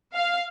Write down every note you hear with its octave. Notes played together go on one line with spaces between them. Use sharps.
F5